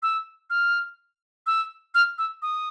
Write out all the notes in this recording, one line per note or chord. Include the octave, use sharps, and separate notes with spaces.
E6
F6
E6
F6
E6
D#6